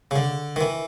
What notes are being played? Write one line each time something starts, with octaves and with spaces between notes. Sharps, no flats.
C#3
D3
D#3
E3